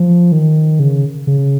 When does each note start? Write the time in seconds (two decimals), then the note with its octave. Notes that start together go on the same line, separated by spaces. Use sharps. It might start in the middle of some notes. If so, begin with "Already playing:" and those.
Already playing: F3
0.32 D#3
0.79 C#3
1.27 C#3